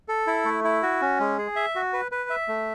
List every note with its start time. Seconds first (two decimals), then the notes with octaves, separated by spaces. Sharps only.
0.08 A4
0.27 E4
0.45 A3
0.64 E4
0.83 F#4
1.01 C#4
1.20 G#3
1.38 G#4
1.56 E5
1.75 F#4
1.93 B4
2.12 B4
2.30 E5
2.48 A3